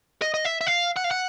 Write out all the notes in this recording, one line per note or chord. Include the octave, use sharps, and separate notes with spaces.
D#5
D#5
E5
E5
F5
F#5
F5
F#5